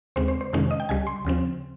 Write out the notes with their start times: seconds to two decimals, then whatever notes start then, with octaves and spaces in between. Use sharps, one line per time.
0.16 D#2 C#3 G#3 C4 C5
0.28 C5
0.41 C5
0.53 F2 C3 D#3 G#3 C#4
0.71 D#5
0.80 G5
0.89 C#2 C#3 G3 G#5
1.07 C6
1.25 D#2 C#3 F3 C4